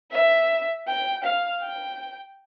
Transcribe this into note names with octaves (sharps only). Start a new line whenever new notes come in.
E5
G5
F5
G5